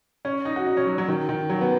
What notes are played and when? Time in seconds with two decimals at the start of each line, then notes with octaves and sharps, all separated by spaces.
0.25 C#4
0.45 D#4
0.56 F#4
0.67 D#4
0.77 C#4
0.87 F#3
0.98 F#3
1.08 D#3
1.29 D#3
1.50 F#3
1.61 B3